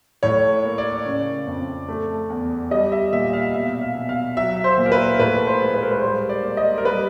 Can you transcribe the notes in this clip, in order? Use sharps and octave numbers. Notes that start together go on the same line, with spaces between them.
A2 C#5
A#3
D5
C#3
F2
A3
E2
G3 D#5
E5
A#2 E5
F5
B2 E5
F5
B2
F5
F#3 E5
C5
A#2
A#4
B4
A#4
A2 B4
C5
G#3
B4
A#4
B4
G3 C5
D5
A#3
D#5
A#4
G3 B4